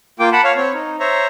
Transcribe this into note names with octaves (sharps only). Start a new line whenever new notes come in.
A#3 F4 G5 D6
F#5 A5 B5
C#5 F5
C4 C#5
D#4
C5 C#5 E5 A#5